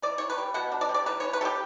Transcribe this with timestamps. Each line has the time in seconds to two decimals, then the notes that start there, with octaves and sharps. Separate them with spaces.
0.02 E3 D5
0.18 E3 C#5
0.30 B4
0.38 G3
0.54 B2 F#5
0.72 D4
0.81 D5
0.89 G3
0.94 D5
1.06 E3 B4
1.20 E3 C#5
1.33 B4
1.41 G3 G4 A4